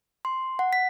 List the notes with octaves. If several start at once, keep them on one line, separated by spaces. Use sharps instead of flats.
C6
F#5
B6